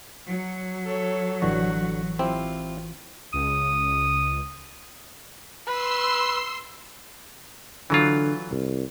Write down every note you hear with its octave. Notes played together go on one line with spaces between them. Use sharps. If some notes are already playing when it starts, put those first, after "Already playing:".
F#3
A4 C#5
A1 D3 E3 G3 F#4 C#6
C4 E4 F4 G4
C#2 D#6
B4 C6 E6 C7
D3 E3 F#3 F4
C2